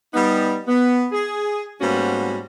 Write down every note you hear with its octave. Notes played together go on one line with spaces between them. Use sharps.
G3 B3 D#4
B3
G#4
G#2 G3 A#3 B3 C#4 F#4